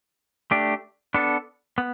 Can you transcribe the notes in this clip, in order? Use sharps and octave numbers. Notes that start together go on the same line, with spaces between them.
A3 D4 G4
B3 D4 A4
B3